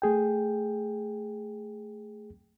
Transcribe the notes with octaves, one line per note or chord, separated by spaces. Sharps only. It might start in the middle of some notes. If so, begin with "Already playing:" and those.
A3 G#4 G5